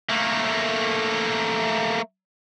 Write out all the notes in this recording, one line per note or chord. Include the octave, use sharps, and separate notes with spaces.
A3 A#3